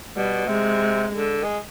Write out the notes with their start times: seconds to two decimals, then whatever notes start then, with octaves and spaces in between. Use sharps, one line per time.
0.15 B2 G3
0.47 C3 G#3
1.13 D3
1.44 G#3